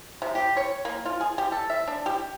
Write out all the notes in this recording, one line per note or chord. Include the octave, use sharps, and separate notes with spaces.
C3
G4
C#5
A#3
F4
G#4
G4
A4
E5
D4
G4